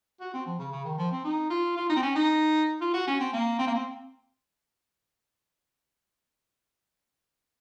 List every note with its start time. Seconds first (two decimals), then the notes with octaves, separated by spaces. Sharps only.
0.20 F#4
0.33 C4
0.46 F3
0.59 C#3
0.72 C#3
0.85 D#3
0.98 F3
1.11 C4
1.24 D#4
1.50 F4
1.77 F4
1.90 D#4
1.95 C4
2.02 C#4
2.16 D#4
2.81 F4
2.94 F#4
3.07 C#4
3.20 C4
3.33 A#3
3.58 C4
3.67 A#3
3.75 C4